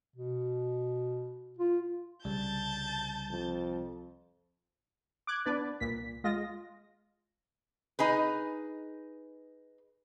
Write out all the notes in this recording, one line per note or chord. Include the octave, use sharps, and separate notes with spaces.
B2
F4
C2 C#3 G3 A5 G6 A6
F2
D6 F#6 G#6
B3 D4 B4 D5
C2 A#2 B6
G#3 F4 D#5 A#6
D#4 G#4 B4